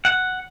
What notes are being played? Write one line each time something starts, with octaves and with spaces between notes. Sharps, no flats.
F#5